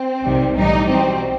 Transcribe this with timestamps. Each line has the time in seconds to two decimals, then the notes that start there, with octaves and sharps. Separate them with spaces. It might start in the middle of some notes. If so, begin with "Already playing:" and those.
Already playing: C4
0.23 C2 C3 D#3 G3
0.55 B1 A2 E3 G3 D#4
0.88 B1 B2 G3 C4